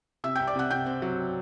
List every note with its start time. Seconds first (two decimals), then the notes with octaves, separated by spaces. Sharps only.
0.24 C3 E5 E6
0.36 C2 G5 G6
0.47 D5 D6
0.56 C3 F#5 F#6
0.71 C3 G5 G6
0.86 C4
1.02 F#3